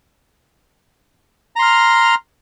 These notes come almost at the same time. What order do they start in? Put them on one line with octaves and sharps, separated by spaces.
A#5 C6 F6